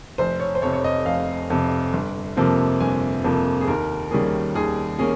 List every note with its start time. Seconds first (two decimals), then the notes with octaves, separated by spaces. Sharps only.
0.18 F1 C5
0.40 C#5
0.55 C5
0.62 F2 C3 C#5
0.73 C#5
0.84 D#5
1.06 F1 F5
1.50 F2 C3
1.93 G1
2.37 F2 C3 F3 A#3
2.80 G1 G#5
3.24 F2 C3 F3 A#3
3.61 G#4
3.67 D#2 A#4
4.11 D#3 G3 A#3 C#4 G#4
4.55 D#2 G#4
4.99 A#3 C#4 G#4